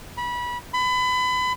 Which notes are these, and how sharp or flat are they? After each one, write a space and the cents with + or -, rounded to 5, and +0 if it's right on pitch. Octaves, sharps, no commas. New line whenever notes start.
B5 -25
B5 +30